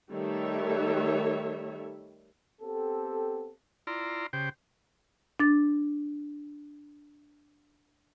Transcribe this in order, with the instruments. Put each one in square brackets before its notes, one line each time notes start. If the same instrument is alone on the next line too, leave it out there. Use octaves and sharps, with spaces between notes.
[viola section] D#3 G3 A3 C#5 E5
[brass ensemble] B3 C4 G4 A4
[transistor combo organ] E4 F4 D5 A#5 C6
C#3 G4 C5 G5
[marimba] D4 A6